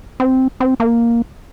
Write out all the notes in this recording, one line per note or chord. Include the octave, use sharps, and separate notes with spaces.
C4
C4
A#3